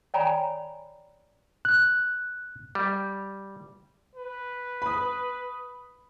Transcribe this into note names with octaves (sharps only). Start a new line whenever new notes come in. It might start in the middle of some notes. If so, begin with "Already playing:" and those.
C#5 D5 G5 G#5 A#5 B5
F#6
G3
B4
B5 D#6